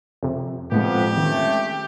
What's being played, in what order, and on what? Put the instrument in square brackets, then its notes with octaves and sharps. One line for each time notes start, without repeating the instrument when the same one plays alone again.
[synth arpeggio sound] F2 C3
[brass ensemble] F2 F3 B3 [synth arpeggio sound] A2 G#3 [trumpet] G4
[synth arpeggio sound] D#3 [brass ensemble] G#3 A3 C#4